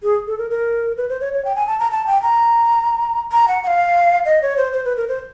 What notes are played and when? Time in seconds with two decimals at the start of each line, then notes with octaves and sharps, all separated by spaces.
0.03 G#4
0.27 A4
0.38 A#4
0.50 A#4
0.97 B4
1.09 C5
1.21 C#5
1.33 C#5
1.45 G5
1.56 G#5
1.67 A5
1.79 A#5
1.91 A5
2.07 G5
2.22 A#5
3.32 A#5
3.48 F#5
3.63 F#5
3.67 F5
4.26 D#5
4.42 C#5
4.57 C5
4.73 C5
4.85 B4
4.97 A#4
5.08 C5